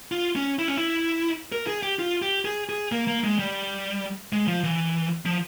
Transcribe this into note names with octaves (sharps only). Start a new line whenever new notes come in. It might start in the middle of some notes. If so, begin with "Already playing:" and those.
F4
C#4
E4
C#4
E4
A#4
G#4
G4
F4
G4
G#4
G#4
A#3
A#3
G#3
G3
G#3
F3
E3
F3